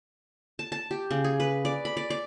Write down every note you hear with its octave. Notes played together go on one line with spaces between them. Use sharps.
A5
A5
G4
C#3
G#4
B4
D5
B5
D5
D5